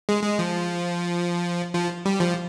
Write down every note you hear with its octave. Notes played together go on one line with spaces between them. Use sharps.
G#3
G#3
F3
F3
G3
F3